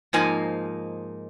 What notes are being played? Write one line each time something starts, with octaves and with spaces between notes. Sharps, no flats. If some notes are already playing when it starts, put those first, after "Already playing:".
G#2 F3 A#3 D#4 G#5